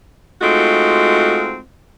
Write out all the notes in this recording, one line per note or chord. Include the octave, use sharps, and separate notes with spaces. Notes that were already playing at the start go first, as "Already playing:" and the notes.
G#3 A3 C4 D#4 F4 F#4